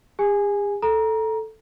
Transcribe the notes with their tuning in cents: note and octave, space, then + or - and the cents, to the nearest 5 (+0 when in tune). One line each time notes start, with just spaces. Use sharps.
G#4 -45 G#5 +0
A4 +0 A#5 +20